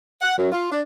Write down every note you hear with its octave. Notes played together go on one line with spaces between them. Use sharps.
F#5
F#2
F4
D4